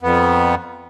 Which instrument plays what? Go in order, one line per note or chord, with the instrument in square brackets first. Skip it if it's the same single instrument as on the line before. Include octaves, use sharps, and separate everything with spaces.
[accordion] F2 B3